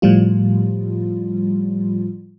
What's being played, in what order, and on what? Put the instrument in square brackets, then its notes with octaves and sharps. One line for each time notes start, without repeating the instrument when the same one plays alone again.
[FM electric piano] A2 F3 G3 F4